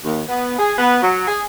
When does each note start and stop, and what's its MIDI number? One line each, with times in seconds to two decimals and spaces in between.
0.04 0.19 39
0.27 0.55 59
0.56 0.73 68
0.77 0.97 59
1.00 1.23 54
1.27 1.40 68